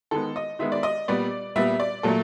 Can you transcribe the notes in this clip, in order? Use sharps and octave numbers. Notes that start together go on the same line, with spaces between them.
D#3 G#3 B3 A4
D#5
D#3 G#3 B3 E5
D5
D#5
A#2 G3 B3 D5
A#2 G3 B3 E5
D5
A#2 F#3 A3 A4